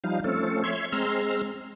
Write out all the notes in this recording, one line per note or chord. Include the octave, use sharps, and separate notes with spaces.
F3 G3 D#4 F5
F3 A3 C4 C#4 A4
C#5 E5 C6 G#6
G#3 C4 A#5 C6 E6 F6